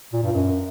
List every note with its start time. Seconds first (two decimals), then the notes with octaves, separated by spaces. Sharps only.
0.13 A#2
0.23 G2
0.33 F#2